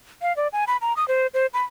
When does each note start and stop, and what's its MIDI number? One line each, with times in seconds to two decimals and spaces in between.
0.22 0.35 77
0.37 0.48 74
0.53 0.64 80
0.67 0.77 83
0.81 0.95 82
0.97 1.07 87
1.08 1.27 72
1.34 1.46 72
1.54 1.63 83